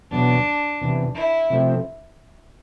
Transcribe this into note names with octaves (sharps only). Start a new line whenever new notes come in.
E2 B2 F#3 B3 D4
E2 C3 E3
E4
C3 F3 A3 C4